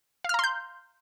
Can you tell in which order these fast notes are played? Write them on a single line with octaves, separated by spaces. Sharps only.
F5 F6 A#5 C6 G6